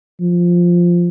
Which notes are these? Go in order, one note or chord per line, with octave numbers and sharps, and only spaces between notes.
F3